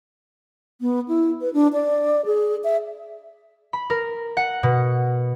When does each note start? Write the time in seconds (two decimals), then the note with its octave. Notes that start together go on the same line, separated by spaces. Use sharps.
0.81 B3
1.08 E4
1.41 B4
1.54 D4
1.73 D5
2.26 G#4
2.64 E5
3.73 B5
3.90 A#4
4.37 F#5
4.63 B2